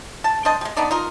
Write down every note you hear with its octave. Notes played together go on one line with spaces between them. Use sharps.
A5
D4 C5 D#5 A5
G3 G#3
B3 D4 D#4 D5
D#4 F4 A#4